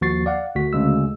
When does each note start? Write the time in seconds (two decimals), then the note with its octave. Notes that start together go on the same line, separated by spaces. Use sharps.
0.01 D#2 F3 F#4 C#6 A6 C7
0.26 D5 F5 F#5
0.55 D2 F#4 B6
0.73 D2 C#3 G#3 E6